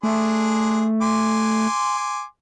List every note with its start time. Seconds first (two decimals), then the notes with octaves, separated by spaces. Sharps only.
0.03 A3 D4 G#4 C6
1.02 G#5 C6 D6